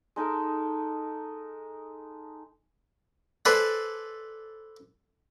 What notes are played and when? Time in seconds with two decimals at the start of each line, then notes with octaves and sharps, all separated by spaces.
0.16 G#3 D#4 A4 A#4
3.45 A4 B4 C5 D5 G#5